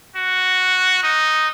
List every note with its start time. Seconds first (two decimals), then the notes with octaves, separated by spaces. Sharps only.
0.16 F#4
1.03 D#4